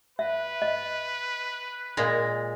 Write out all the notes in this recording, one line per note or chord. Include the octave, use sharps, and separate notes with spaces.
B4 E5
D#5
A#2 G#3